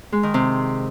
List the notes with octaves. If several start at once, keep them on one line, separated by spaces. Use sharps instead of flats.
G#3
D#3
C3